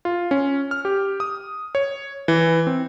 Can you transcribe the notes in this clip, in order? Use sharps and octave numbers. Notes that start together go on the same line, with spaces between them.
F4
C#4
F6
G4
D#6
C#5
E3
C4